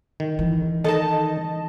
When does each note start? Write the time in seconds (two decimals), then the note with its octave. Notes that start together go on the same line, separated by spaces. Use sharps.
0.20 D#3
0.39 E3
0.84 D#3 D#4 A4 D#5 A5